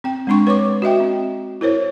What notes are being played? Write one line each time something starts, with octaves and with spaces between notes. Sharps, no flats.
C4 G5
G#3 C4 D4 C6 C#6
B4 C#5 C#6 D6
F#4 D#5 E5 G5
C4
E4 A#4 C5 C#5